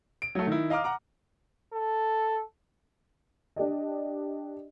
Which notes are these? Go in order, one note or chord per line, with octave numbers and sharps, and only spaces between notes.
D7
F#3 A3
D#3 E4
D#5 F5 A#5 D6 F6
F#5 A#5 D6
A4
D4 G4 D5 D#5